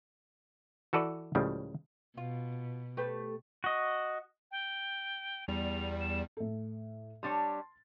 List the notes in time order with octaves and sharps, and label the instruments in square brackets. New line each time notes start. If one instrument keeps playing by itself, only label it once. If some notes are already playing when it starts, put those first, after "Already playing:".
[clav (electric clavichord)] E3 F#4 A4 B4 D5
C#2 A2 C#3 F3 G3
[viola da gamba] B2 [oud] F4
[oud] A3 G4 B4
[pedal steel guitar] F#4 D#5
[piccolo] G5
[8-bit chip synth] E2 G3 [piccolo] F7
[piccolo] E7
[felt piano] A2 A4
[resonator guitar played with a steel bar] G3 D4 C#5 [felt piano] C6 A6